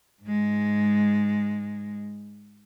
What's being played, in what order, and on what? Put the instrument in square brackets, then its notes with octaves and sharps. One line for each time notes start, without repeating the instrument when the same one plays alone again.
[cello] G#2 G#3